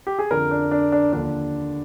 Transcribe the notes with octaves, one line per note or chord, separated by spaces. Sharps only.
G4
G#4
F2 D3 F3 A#4
D4
D4
D4
D#2 D3 F3 D4